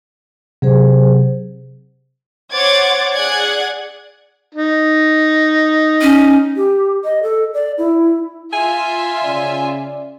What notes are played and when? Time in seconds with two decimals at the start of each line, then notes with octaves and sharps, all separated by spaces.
0.62 C3 F#3 G#4 C5
2.52 C5 C#5 F#5 D6 G#6 A6
3.14 G#4 D5 F#5 F#6 G#6
4.55 D#4
6.02 C#4
6.56 G4
7.04 D#5
7.23 A4
7.54 D5
7.78 E4
8.53 F4 E5 G#5
9.23 C#3 C#4 D5